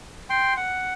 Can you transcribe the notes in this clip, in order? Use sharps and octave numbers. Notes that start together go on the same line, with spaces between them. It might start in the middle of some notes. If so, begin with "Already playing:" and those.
G5 C6
F#5